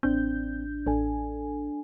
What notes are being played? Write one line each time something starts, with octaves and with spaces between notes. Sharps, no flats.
A1 C4 D4 G6
A1 D4 A4 G#5